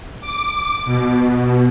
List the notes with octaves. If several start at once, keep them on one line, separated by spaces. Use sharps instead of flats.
D6
B2